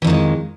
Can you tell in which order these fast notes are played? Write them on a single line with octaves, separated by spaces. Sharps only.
E3 F2 D#3 G#3